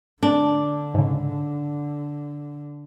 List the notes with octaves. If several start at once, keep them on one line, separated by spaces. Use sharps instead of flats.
D3 D4
G#2 C#3